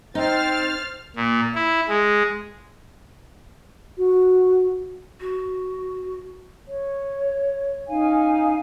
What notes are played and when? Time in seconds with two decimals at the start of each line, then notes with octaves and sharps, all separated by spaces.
0.15 C4 D#4 C5 F6 A6
1.16 A#2
1.55 E4
1.88 G#3
3.98 F#4
5.21 F#4
6.66 C#5
7.88 C#4 D#4 F5 G#5